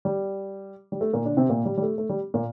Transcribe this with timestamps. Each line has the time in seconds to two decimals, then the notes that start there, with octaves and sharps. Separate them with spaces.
0.05 G3
0.92 G3
1.01 A3
1.13 A#2 A#3
1.25 D3 D4
1.37 C3 C4
1.49 A#2 A#3
1.65 G3
1.78 G3
1.82 A3
1.98 A3
2.09 G3
2.34 A#2 A#3